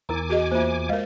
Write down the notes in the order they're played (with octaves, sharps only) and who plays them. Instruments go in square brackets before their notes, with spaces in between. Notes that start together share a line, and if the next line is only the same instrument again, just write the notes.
[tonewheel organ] E2 G#5 D6 [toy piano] E4 A#4 A#5
[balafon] F#4 G#4 D#5
[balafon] A#3 E5 [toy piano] F4 C5
[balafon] G#3 A#4 [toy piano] D#5 F5